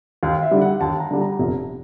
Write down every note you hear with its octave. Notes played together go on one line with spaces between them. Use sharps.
D#2 F5
E5
D3 G3
F#5
D#2 A5
A#5
D3 G3
A#5
F1